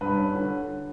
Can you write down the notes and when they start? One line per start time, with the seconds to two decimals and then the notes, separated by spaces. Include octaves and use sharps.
0.01 G2 B4
0.17 C#4
0.35 D3